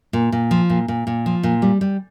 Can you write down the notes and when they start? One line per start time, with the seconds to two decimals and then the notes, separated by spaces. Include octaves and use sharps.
0.13 A#2
0.32 A#2
0.51 F3
0.70 A#2
0.88 A#2
1.07 A#2
1.26 F3
1.43 A#2
1.62 G3
1.81 G3